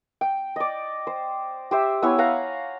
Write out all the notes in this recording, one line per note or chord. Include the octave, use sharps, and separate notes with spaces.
G5
D5 D#5
C5
G4 C5 E5
B3 E4 C#5 G#5
F5 F#5 A#5